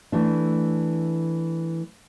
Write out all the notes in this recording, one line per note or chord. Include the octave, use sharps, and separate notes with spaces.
E3 A3 D4